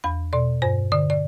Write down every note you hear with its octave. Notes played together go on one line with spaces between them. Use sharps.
E2 B5
B2 D5
G2 C5
D3 D5
D5